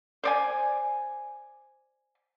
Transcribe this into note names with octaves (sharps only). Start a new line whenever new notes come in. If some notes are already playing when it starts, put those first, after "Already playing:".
C5 D5 G#5